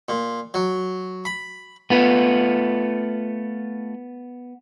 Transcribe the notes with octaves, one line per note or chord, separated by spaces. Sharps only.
A#2
F#3
B5
A3 B3 F4 B4